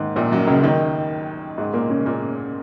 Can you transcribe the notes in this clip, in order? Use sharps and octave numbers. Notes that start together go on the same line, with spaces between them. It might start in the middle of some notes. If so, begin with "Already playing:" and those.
Already playing: D#2 G#2 D#3
A#1 A#2
F#2 F#3
C#2 C#3
D#2 D#3
G#2 G#3
A#2 A#3
C#3 C#4
G#3
A#2 A#3